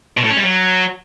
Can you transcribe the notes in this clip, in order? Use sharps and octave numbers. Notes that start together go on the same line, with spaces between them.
B2
A2
C#4
G3
F#3